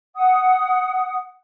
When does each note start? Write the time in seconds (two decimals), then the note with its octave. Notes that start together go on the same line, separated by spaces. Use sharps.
0.15 F#5 D#6